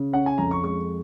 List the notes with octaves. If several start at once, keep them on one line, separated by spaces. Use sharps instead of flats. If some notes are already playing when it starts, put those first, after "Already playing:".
Already playing: C#3
C#4 F#5
G#5
F2 A#5
C#6
G#3 C#6